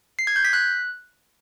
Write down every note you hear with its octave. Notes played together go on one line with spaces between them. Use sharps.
C7
G#6
G6
B6
F#6